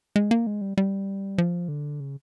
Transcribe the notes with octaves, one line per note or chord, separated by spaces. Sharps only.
G#3
A#3
G#3
G3
G3
F3
D3
C#3